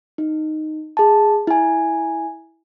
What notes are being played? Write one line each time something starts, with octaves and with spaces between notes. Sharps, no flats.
D#4
G#4 A5
E4 G#5